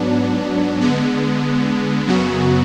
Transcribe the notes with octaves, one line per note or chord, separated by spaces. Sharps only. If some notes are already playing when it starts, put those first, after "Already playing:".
Already playing: G#2 F#3 B3 D4
D3 G#3 B3
F#2 C#3 F#3 B3 F#4